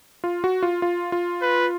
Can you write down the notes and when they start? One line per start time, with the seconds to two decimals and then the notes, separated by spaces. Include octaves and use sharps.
0.24 F4
0.44 F#4
0.63 F4
0.82 F4
1.12 F4
1.42 B4